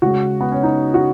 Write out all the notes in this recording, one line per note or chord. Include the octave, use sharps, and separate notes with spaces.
C#3 G#3 F#4
B3
C#4
D#4
F#4